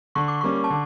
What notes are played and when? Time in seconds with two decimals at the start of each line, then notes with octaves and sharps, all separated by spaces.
0.15 D3 C#6
0.28 D6
0.41 G3 A#3 C#4 C#6
0.64 A5
0.70 D3